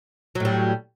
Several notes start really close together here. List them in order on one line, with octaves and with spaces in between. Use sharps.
F#3 A2 G3